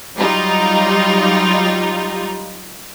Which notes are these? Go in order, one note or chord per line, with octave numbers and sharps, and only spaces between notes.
F#3 G3 D#4 F4